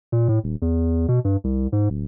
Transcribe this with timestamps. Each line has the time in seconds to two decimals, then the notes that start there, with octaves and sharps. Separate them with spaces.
0.12 A#2
0.28 A2
0.44 D#1
0.62 E2
1.08 B2
1.25 G2
1.44 C2
1.72 G#2
1.90 D1